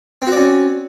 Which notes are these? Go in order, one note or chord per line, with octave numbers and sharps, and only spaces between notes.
C4 C#4 F#4 D5